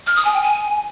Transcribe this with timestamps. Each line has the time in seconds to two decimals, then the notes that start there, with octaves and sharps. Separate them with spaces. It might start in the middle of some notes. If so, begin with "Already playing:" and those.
0.07 F6
0.16 D#6
0.25 G#5
0.34 G5
0.43 G#5